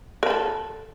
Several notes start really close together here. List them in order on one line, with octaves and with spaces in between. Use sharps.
A#4 B5 A4